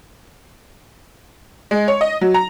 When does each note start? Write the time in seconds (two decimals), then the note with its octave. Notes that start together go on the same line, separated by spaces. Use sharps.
1.71 G#3
1.88 C#5
2.01 D#5
2.21 F#3
2.34 A#5